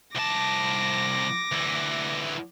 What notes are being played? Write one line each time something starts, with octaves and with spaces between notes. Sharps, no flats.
C2 A5 D6 A#6
D2 E3